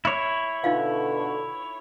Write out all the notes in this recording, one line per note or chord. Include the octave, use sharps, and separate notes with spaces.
E4 C#5
B2 D3 D#4 F4 F5